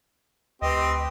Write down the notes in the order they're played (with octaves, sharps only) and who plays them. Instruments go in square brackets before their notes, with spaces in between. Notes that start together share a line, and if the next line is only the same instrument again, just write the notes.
[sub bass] D2 [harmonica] C4 G4 [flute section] B4 G5 [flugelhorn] D#5